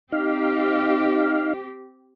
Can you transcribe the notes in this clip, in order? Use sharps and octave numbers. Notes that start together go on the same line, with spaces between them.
C4 D#4 G4 F5